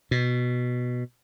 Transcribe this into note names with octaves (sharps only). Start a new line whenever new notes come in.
B2